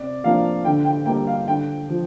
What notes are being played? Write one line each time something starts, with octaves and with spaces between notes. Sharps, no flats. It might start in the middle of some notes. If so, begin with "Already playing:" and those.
Already playing: C3 D5
F3 A#3 D4 F5
D3 G5
G5
G3 A#3 G5
F5
D3 G5
F3